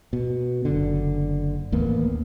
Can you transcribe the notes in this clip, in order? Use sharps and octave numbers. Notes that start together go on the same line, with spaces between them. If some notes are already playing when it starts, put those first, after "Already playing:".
B2
F#1 D3
A1 D#2 A#3 B3